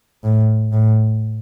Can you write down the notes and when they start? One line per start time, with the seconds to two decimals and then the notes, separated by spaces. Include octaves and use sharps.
0.24 A2
0.72 A2